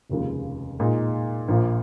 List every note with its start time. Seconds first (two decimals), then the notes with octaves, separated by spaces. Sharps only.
0.10 F1 D#2 C#3 F3 G#3
0.80 A#2 G#3 D#4
1.48 A#1 A#2 F3 A#3